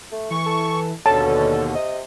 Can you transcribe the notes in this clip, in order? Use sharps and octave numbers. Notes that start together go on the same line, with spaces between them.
A3
E3 C#6
A4
D#2 B2 D3 C#4 A4 A5
C3 D#5